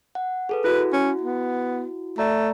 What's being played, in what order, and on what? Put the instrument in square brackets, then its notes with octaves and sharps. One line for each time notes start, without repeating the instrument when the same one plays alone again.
[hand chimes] F#5
G#4 A4 B4
[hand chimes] E4 F#4 [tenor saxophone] B4
[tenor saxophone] C#4
B3
[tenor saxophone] A3 [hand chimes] D5 A#5